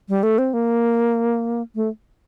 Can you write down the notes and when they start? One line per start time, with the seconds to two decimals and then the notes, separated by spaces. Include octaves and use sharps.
0.09 G3
0.23 A3
0.38 C4
0.53 A#3
1.75 A3